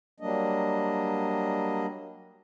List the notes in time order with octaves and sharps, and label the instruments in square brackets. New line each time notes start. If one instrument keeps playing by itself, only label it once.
[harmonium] F#3 G3 A#3 D4 D#5